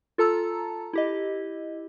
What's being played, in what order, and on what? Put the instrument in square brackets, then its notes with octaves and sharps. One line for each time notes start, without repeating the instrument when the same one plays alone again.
[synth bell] F4 A4 A5 A#5 E6
E4 G4 D#5